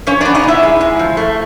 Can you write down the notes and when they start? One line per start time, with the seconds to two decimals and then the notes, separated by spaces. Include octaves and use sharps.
0.07 F3 C#4 C#5
0.21 B3 D4 D5
0.35 D#4 D#5
0.44 A#2 E4 E5
0.63 G#3
0.81 G#3
0.99 F3
1.17 A3